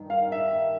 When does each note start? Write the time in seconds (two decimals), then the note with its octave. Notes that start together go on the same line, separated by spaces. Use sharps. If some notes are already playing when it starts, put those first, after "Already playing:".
Already playing: G2 D#3
0.10 F5
0.32 E5